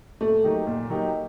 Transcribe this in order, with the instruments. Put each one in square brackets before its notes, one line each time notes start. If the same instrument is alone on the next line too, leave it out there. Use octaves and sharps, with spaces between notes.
[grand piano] A#2 [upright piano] A3
[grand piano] F#3 A#3 D#4 G4
A#2
F#3 A#3 D#4 G4